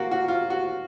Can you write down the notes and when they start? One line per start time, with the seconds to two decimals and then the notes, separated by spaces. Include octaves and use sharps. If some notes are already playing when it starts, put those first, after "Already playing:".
Already playing: A#3 F#4
0.11 F#4
0.28 F4
0.50 F#4